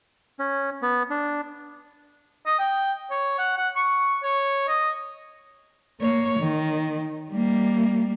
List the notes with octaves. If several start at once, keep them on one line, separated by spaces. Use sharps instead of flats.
C#4
B3
D4
D#5
G5
C#5
F#5
F#5
C#6
C#5
D#5
A#3 C#5
D#3
G3 A#3